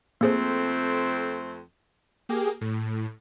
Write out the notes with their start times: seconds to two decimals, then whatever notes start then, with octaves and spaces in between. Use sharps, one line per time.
0.21 F2 A3 A#3 C4 G#4 C5
2.29 A#3 G4 G#4
2.61 A2